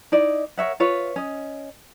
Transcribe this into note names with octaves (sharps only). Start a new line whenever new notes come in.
D#4 E4 D5 D#5
A#4 C#5 E5 F#5
F4 B4 C#5 E5
C#4 D#5